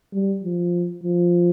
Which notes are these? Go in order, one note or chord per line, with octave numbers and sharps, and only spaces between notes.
G3
F3
F3